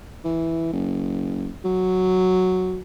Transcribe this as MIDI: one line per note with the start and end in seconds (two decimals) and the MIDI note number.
0.24 0.72 52
0.73 1.50 30
1.65 2.80 54